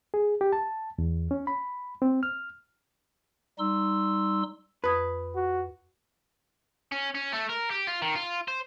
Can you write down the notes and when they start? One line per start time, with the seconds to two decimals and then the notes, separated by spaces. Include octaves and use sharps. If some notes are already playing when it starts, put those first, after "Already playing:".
0.14 G#4
0.41 G4
0.53 A5
0.98 E2
1.31 C#4
1.47 B5
2.02 C4
2.23 F6
3.59 G3 D#4 C6 E6
4.84 F2 B4 D#6 G#6
5.36 F#4
6.92 C#4
7.15 C#4
7.33 A3
7.50 A#4
7.71 G4
7.87 F4
8.02 D#3
8.16 F4
8.48 C5